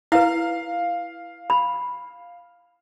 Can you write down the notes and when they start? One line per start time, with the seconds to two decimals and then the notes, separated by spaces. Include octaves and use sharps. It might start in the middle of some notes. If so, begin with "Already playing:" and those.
0.12 E4 B4 F5
1.50 B5